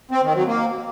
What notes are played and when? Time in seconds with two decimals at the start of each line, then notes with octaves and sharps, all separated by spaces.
0.11 C4
0.23 D#3
0.35 F#3
0.47 A#3